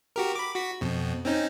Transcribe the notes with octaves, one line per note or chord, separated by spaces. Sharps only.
F#4 G4 A#4
B5 D6
F#4 B6
F2 B2
C4 C#4 D#4